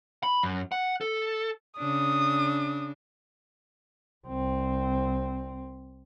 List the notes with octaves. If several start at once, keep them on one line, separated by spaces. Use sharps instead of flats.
B5
F#2
F#5
A4
C#3 D4 D#6
C2 C4